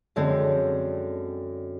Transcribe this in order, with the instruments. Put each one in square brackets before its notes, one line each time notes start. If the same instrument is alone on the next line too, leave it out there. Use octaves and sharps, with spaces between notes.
[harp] F#2 D3 G#3 C4